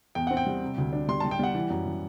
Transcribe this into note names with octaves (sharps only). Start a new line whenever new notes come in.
E2 G5
C4 F#5
G5
G3
C3
D2
D4
G3 C6
G3 A5
G5
G3 F#5
E3
F#2
E3